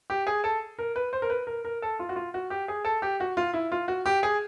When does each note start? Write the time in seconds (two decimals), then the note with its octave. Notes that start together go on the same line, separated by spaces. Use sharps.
0.10 G4
0.27 G#4
0.44 A4
0.79 A#4
0.96 B4
1.13 C5
1.22 A#4
1.30 B4
1.47 A#4
1.65 A#4
1.82 A4
1.99 F4
2.09 F#4
2.16 F4
2.34 F#4
2.50 G4
2.68 G#4
2.85 A4
3.02 G4
3.20 F#4
3.37 F4
3.53 E4
3.72 F4
3.88 F#4
4.06 G4
4.23 G#4